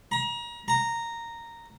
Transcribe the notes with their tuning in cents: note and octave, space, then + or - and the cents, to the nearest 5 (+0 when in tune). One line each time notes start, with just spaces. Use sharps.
A#5 +30
A#5 -10